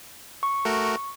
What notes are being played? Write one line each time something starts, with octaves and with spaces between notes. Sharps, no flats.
C#6
A3 F#4 A#4